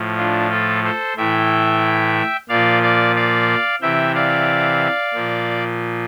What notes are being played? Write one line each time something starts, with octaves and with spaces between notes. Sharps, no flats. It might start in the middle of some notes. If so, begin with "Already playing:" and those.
Already playing: A2 F3
D4 F4
F4 A4
A4 C5
A2 E3 E5 G5
A#2 F3 D5 F5
D5 F5
D5 F5
C3 E3 E5 G5
D5 F5
A#2 F3